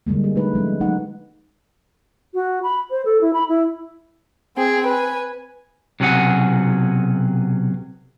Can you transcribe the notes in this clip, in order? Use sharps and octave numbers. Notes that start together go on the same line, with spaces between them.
D3 G3 G#3 A#3
G#4
A3 D#4 B4
F3 G#3 C#4
F#3 A3 D#4 F#5
F#4
B5
C5
A4
E4
B5
E4
C4 G#4 G5
B4 G#5
B1 C3 F#3 C#4 G#4 F#5